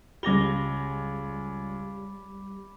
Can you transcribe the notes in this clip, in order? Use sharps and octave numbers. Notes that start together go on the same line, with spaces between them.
C#2 G3 G4 B5 D6 A#6 G7